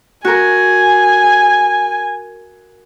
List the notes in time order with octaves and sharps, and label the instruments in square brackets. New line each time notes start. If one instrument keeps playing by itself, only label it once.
[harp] F#4 A#4 [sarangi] G#5